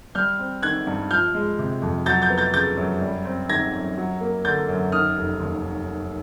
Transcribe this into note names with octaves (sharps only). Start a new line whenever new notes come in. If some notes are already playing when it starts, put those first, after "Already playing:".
G3 F6 G6
C4
D#3 F#6 G#6
G2
F3 F6 G6
G#3
C3
F2
F#3 G6 A6
G6 A6
B3
G6 A6
C#3 G6 A6
F#2
G3
C4
D#3 G#6 A#6
F#2
F#3
A#3
D3 G6 A6
F#2
D#3 D#6 F6
F1
D#2